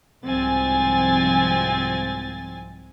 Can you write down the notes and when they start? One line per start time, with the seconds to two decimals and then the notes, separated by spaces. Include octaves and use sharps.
0.24 C2 G#2 F3 C4 G#5 A6